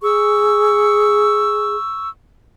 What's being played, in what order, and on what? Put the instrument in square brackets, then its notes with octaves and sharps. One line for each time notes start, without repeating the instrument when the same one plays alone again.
[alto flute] G#4 [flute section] C#6 E6